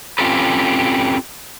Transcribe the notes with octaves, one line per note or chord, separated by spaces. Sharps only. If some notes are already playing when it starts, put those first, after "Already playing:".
C4 C#4 F4 G4 A4 B4